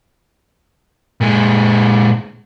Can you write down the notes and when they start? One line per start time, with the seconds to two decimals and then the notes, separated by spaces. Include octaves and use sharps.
1.21 A#2 G#3